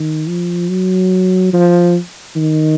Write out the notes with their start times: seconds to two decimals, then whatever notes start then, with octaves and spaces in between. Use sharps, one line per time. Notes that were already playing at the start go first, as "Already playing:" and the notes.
Already playing: D#3
0.28 F3
0.69 F#3
1.53 F3
2.36 D#3